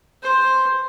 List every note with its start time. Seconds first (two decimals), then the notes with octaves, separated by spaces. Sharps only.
0.23 C5